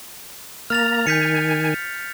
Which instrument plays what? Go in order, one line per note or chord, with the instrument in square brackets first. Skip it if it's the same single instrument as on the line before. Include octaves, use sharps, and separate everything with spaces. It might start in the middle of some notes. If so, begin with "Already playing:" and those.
[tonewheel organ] A#3 A#5 [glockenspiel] F6 A6 F7
[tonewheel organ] D#3 G#5 [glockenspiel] G6 B6 C#7